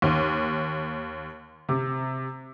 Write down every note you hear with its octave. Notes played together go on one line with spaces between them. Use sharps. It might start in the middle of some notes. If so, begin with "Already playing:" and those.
D#2
C3